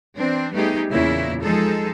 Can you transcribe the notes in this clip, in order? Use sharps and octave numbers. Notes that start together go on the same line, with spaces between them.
E3 C4 D4
G3 A3 B3 D#4 G4 G#4
E2 A#2 C#3 A#3 E4
F3 G#3 D#4 G#4 A4